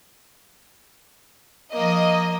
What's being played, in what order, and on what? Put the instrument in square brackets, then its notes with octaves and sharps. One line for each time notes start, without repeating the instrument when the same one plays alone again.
[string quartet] F3 [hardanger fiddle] A#3 [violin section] D#5